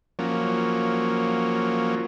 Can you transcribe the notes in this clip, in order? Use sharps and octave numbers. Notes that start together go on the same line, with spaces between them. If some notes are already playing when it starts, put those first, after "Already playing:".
F3 F#3 A#3 C#4